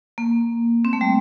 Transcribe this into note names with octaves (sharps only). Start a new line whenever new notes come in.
A#3
C4
A3
G3